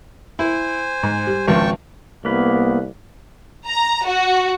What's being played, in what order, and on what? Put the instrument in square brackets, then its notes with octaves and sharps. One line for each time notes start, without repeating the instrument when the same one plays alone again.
[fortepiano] E4 [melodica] C5 G#5
[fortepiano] G#2
G3
[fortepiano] G#1 C#2 F3 [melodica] G5 A5 C#6
[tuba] C2 [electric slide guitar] A#3 B4 [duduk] B3
[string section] A#5
F#4